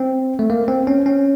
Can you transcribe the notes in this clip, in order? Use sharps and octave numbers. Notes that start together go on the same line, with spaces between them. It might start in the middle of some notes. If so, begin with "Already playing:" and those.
Already playing: C4
A3
A#3
C4
C#4
C#4